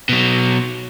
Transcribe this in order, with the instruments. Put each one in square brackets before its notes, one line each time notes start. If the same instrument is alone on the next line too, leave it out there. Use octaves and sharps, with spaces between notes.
[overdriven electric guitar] B2 F#3